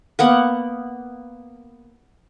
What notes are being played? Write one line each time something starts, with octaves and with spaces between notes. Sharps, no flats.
A#3 B3 F#5